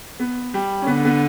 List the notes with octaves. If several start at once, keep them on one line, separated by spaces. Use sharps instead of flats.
B3
G3
C#4
D3 B3
B3